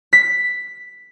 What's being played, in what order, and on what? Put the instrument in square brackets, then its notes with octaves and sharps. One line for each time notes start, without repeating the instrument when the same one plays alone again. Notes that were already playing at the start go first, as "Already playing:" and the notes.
[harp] B6